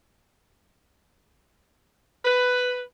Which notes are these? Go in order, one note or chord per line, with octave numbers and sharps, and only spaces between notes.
B4